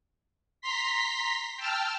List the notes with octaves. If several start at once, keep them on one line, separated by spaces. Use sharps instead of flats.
A#5 C6 B6
G5 A5 E6 F6